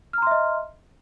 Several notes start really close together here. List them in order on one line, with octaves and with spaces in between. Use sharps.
F6 A#5 C6 E5 D#5